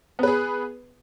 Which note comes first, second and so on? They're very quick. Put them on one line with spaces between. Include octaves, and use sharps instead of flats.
B3 B4 G#4